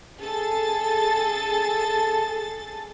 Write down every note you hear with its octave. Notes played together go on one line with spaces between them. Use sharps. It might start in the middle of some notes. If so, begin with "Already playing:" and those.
G#4 A4 A6